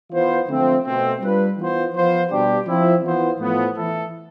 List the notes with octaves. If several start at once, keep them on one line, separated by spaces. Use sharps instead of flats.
E3 B3 F4 C5
D3 F3 A3 C4
B2 A3 C4
G3 D4 F4 B4
E3 B3 F4 C5
F3 B3 F4 C5
B2 G3 D4 G4
F3 C4 E4
E3 B3 F4 C5
A2 F3 B3
E3 A3 E4 A4